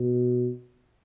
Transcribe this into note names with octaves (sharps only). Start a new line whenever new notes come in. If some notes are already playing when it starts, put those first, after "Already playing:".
Already playing: B2